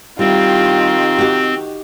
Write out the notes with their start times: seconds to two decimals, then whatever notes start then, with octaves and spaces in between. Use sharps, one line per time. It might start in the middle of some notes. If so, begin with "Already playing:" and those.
0.19 D#3 G3 C4 E4 F4 G4
1.18 F#4 G4